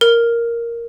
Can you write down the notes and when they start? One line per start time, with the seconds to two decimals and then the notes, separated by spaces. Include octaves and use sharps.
0.01 A#4